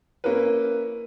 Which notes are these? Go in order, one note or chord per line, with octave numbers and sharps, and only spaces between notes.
A#3 C#4 E4 A#4 B4